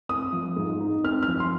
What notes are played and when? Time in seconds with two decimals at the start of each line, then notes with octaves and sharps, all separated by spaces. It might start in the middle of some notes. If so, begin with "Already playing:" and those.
0.09 C4 D#6
0.33 F3
0.56 G#2
0.81 D#4
1.04 C4 F6
1.23 F6
1.28 F3
1.40 C6